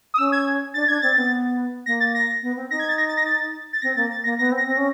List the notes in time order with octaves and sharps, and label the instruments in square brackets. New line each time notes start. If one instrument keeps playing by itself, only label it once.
[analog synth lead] D#6
[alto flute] C#4 [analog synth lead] E6
[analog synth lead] G#6
[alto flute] D4 [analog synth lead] A6
[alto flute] D4 [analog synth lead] G#6
[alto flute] C4 [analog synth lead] A6
[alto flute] B3
[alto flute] A#3 [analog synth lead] A#6
[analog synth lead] A6
A#6
[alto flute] B3
C4
[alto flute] D#4 [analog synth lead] A#6
[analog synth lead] G#6
A6
A#6
A6
A#6
A6
A6
[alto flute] C4 [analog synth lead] A#6
[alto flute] A#3 [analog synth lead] A6
[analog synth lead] A6
[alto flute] A#3 [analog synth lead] A#6
[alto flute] B3 [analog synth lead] A#6
[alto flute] C4
[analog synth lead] A#6
[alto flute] C4
C#4